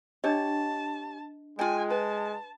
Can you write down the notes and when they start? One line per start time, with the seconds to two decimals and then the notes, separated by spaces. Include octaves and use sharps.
0.24 D4 G4 C#5 D#5 A5
1.59 G#3 F4 G5 G#5
1.91 B4 A5